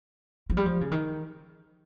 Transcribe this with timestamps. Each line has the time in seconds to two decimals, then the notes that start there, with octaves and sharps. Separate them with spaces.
0.50 F3
0.57 G3
0.66 F3
0.81 C#3
0.92 D#3